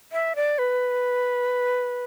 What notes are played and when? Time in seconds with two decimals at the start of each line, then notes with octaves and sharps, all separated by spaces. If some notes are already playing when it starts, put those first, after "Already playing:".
0.12 E5
0.36 D5
0.58 B4